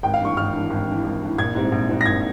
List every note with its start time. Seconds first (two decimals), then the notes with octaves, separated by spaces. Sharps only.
0.03 G#1 G5
0.14 F5
0.20 G2 E3 C#6
0.37 G#1 F6
0.53 G2 E3
0.70 G#1
0.88 G2 E3
1.04 G#1
1.21 G2 E3
1.38 A#1 G#6
1.55 G#2 G3 C4 E4
1.72 A#1
1.89 G#2 G3 C4 E4
2.01 A#6
2.06 A#1 G#6